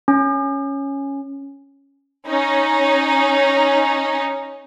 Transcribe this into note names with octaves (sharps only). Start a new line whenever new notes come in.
C#4
C#4 D#4